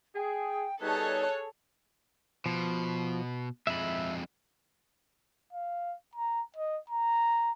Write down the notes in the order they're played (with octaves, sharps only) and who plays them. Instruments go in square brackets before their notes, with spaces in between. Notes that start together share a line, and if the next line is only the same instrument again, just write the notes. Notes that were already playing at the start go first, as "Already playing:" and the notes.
[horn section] G#4 [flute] G5
[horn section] G3 B3 D#4 [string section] G#4 A4 C#5 [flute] F#6
[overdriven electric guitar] B2 [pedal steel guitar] F3
[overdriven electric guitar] F2 G#3 [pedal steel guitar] E5 B5
[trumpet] F5
A#5
D#5
A#5